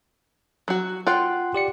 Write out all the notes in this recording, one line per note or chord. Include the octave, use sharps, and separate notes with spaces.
F#3 F#4
F4 F#5 G5 C6 F#6
G4 D5 C#7